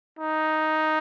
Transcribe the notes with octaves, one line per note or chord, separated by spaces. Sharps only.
D#4